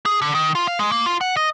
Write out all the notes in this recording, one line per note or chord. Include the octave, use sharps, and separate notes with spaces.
G#4
D3
D#3
F4
F5
G#3
A#3
F4
F#5
D#5